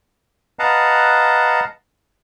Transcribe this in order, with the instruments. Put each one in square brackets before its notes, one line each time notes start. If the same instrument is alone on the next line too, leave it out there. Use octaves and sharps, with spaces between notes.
[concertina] B4 D#5 F5 F#5 A5 A#5